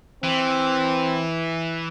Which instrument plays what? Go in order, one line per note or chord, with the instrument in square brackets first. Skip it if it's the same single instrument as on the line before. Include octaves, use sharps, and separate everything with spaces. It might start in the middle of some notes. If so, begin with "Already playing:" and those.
[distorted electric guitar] E3 [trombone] C4